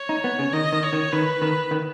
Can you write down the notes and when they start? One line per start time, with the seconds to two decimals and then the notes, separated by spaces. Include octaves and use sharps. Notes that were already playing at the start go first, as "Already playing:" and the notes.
Already playing: C#5
0.09 D#4
0.24 B3
0.39 C#3
0.53 D#3 D#5
0.73 D#3
0.83 C#5
0.93 D#3
1.12 D#3 B4
1.42 D#3
1.71 D#3